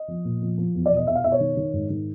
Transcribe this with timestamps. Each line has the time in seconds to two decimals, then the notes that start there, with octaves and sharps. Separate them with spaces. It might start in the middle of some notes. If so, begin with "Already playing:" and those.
Already playing: D#5
0.08 F3
0.25 A#2
0.41 F3
0.58 F3
0.75 E2
0.86 D5
0.91 B2
0.97 D#5
1.07 B2 E5
1.15 F5
1.24 B2 E5
1.32 C#5
1.40 D#3
1.57 D#3
1.74 G#2
1.90 D#3